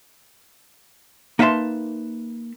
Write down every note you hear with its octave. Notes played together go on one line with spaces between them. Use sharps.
A#3 D#4 B4 E5 A5 C6